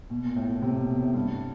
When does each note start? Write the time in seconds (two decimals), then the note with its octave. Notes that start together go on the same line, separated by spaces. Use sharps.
0.10 B2
0.24 A#2
0.36 A2
0.49 A#2
0.62 C3
0.75 B2
0.89 B2
1.02 A2
1.15 G2